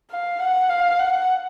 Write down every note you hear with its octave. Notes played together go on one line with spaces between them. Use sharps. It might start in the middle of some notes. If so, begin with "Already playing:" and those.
F5
F#5
F5
F#5